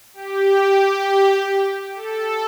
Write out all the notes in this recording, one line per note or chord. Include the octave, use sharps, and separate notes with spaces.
G4
A4